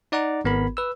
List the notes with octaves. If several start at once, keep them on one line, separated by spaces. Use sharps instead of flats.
D#4 D5 F#5 A#5 D6
G#1 B3 A#4 B5
B4 E6